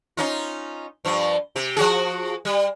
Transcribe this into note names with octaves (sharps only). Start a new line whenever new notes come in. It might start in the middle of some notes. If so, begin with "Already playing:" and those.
C#4 D#4 F4
G2 F3
C3 G4
F3 F#4 G#4
G3